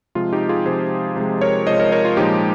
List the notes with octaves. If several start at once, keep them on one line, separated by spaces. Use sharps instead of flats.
C3 F3 G#3 F4
D#4 G4
F4 G#4
C3 F3 G#3 G#4 C5
C3 F3 G#3
A#4 C#5
C3 F3 G#3 C5 D#5
A#4 C#5
A#4 C#5
F4
A#2 F3 G#3 D#4 G4